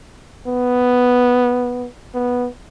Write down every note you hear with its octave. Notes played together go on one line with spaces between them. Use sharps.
B3
B3